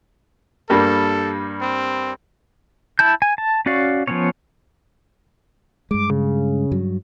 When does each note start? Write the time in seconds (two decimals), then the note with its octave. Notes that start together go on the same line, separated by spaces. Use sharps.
0.70 G2 G3 A#3 A4
1.61 C4
2.99 E4 A5 G6
3.22 G#5
3.38 A5
3.66 C#4 F#4 D5 F5
4.07 F3 A#3 B3 C#4 C#5
5.91 G2 G#3 D6
6.10 C#3
6.71 G2 F#3